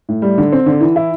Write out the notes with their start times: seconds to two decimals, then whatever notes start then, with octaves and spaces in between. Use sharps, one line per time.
0.09 A2
0.22 G3
0.38 D3
0.52 C4
0.66 D3
0.81 E3
0.96 E4